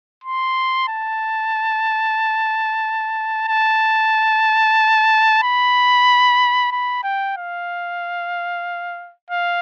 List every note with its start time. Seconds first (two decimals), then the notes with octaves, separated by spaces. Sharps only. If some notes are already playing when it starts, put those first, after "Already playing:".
0.24 C6
0.89 A5
3.48 A5
5.43 B5
6.72 B5
7.04 G5
7.37 F5
9.31 F5